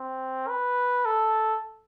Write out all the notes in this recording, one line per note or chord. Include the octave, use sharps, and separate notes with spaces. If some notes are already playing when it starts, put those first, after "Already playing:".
Already playing: C4
B4
A4